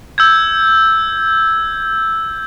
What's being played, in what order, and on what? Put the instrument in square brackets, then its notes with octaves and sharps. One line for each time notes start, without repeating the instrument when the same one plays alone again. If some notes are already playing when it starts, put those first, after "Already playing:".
[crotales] E6 G6 G#6